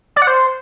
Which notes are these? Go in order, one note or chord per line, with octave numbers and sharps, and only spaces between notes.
D5
F#5
C5